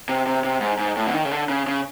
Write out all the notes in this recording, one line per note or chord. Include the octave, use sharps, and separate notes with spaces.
C3
C3
C3
G#2
G#2
A2
D3
D#3
C#3
D3
C#3
C#3